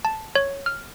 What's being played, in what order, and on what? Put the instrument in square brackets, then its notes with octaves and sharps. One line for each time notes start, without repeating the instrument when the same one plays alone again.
[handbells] A5
C#5
F6